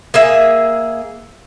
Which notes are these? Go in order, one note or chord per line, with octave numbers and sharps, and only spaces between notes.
A#3 G#4 E5